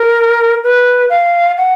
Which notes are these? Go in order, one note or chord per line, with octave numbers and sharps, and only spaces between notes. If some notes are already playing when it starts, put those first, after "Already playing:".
Already playing: A#4
B4
F5
F#5